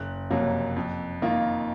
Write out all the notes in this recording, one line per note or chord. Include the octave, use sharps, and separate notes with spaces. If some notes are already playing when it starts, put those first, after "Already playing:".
Already playing: F#1 F#6
F2 C3 F#3 A#3
F2
D#3 A#3 F4